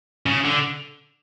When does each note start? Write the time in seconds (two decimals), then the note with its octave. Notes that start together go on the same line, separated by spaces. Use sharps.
0.26 C#3
0.45 D3